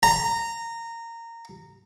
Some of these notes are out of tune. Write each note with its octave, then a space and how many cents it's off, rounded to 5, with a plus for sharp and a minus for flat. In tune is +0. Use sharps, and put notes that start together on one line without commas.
A#5 -15